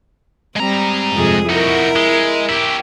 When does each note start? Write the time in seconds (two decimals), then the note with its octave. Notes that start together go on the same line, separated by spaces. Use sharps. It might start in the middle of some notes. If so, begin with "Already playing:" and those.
0.57 G3 G#3 C4 A#5
1.14 F2 C3 G#4
1.50 D#4 E4 F#4 A#4
1.96 G#3
2.49 E4 G4